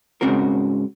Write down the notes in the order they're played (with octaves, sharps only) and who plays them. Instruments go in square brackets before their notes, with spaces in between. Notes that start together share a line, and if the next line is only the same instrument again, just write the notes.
[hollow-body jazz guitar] G#2 C#3 C4 F#4 A#4